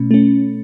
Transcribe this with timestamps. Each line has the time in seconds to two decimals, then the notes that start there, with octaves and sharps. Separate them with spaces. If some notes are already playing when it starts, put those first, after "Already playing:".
Already playing: B2 A3 C#4
0.11 A3 C#4